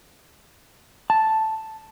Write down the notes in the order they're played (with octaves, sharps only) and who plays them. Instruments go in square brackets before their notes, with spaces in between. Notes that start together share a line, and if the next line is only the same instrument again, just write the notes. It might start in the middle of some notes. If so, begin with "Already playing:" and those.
[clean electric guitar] A5